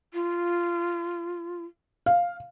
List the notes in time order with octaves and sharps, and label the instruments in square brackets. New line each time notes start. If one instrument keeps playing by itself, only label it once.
[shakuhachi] F4
[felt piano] F5